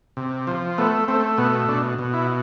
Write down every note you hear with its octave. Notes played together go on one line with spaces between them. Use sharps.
C3
F3
A3 B3
A3 C4
B2 B3
B2 D4
B2
E4